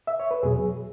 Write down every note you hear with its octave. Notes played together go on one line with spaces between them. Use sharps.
E5
C#5
B4
E2 B2 F#3 G#4